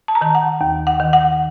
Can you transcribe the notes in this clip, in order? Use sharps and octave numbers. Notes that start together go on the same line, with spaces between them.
A5
A#5
D#3 A5
F#5
D#2
F#5
D#3
F#5